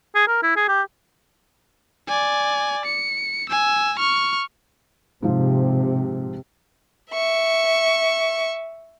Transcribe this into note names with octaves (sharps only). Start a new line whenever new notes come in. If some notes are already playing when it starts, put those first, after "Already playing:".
G#4
A#4
E4
G#4
G4
D5 G#5
C#7
G#5 E6
C#6 F6
G#2 C3 F3
E5 C#6